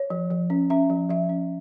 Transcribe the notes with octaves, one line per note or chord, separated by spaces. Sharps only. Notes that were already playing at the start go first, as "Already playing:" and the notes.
Already playing: C#5
F3
F3
C#4
C#4 E5
F3
F3 E5
C#4